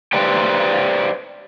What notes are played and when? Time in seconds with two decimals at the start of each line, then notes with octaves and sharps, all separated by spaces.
0.13 G4 B4 C5 D5 G5